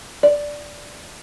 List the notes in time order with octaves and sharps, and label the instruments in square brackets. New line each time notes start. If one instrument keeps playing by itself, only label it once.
[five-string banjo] D5